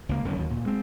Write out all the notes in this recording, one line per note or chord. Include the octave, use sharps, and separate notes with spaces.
C#2 A#3
B1 F#2 D3 D#3
D#2 B2
D2 A#2
G2 G#3 C4